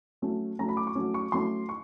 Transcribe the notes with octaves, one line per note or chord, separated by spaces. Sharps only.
F#3 A3 C#4
F#3 A3 C#4 A#5
B5
D6
C#6
F#3 A3 C#4
C#6
F#3 A3 C#4 C6
C#6